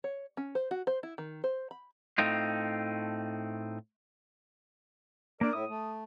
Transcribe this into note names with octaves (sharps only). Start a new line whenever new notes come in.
C#5
C#4
C5
F#4
C5
E4
D#3
C5
B5
A2 A3 C4 D#4 F4
A#3 D4 A#4 D5
A2 E4 D#6
A3